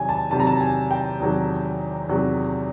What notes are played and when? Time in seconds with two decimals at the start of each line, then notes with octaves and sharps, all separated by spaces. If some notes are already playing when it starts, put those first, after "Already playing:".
Already playing: E2 C3 D#3 F#3 G#5
0.09 A5
0.31 E2 C3 D#3 F#3 A5
0.40 A#5
0.47 A5
0.61 G#5
0.91 G5
1.20 E2 C3 D#3 F#3
2.09 E2 C3 D#3 F#3